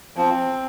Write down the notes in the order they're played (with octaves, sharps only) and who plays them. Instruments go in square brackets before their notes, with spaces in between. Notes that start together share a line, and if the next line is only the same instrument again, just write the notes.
[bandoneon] F3 [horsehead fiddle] C4